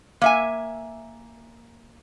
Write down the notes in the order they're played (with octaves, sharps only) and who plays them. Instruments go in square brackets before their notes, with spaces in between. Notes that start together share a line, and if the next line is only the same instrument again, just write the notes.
[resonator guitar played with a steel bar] A#3 E5 G#5